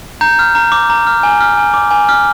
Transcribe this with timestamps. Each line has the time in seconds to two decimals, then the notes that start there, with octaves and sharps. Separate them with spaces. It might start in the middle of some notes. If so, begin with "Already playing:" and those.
0.21 A#5 G6
0.39 F6
0.55 A#5
0.72 D6
0.90 A#5
1.07 F6
1.23 G#5
1.41 F6
1.57 G#5
1.74 D6
1.91 G#5
2.09 F6